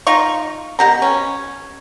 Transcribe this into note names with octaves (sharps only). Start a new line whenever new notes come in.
D#4 F4 F5 C#6
B2 G4 A#5
C#4